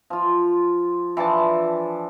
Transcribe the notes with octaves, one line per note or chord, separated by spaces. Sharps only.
F3 F4
E3 F3 D4 A5